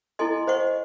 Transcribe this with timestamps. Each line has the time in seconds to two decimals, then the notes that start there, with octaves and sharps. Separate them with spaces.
0.19 E4 A4 D#5 G#5 C6
0.47 C5 D#5 F#5 C#6